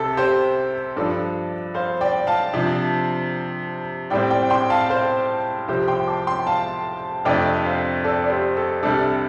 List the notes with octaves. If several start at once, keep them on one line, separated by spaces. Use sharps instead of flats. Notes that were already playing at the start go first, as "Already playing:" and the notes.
Already playing: C2 C3 C4 G4 A4
G4 C5
G2 F3 D4 A4 D5
C5 F5
D5 G5
F5 A5
C3 F3 D4
A2 G3 C4 D5 G5
D5 G5
G5 C6
F5 A5
C5 F5
C2 C3 F3 G4 C5
G5 C6
A5 D6
G5 C6
F5 A5
F2 C3 A3 D4 D5 G5
C5 F5
A4 D5
D5
G4 C5
A4
C2 C3 G3 D4 A4